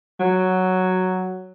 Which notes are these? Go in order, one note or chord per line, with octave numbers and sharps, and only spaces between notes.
F#3